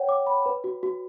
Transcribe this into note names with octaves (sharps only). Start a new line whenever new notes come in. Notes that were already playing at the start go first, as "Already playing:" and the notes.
Already playing: C#5 F#5 G5
D6
B5
B4
F#4
F#4